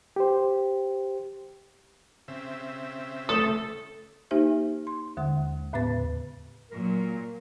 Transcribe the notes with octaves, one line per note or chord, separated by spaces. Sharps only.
G4 C5
C#3 C4 E5
A3 A4 D#6
A#3 D#4 G4 C5 E5
C6
D#2 D3 G#3
D#2 A2 C#3 B3 B4 A6
A#2 F#3 A#4